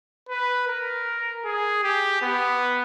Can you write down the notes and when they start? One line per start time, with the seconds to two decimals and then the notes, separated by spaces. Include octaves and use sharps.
0.29 B4
0.68 A#4
1.45 G#4
1.83 G4
2.22 B3